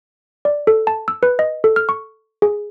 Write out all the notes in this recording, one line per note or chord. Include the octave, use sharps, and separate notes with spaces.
D5
A4
A5
E6
B4
D#5
A4
F6
C#6
G#4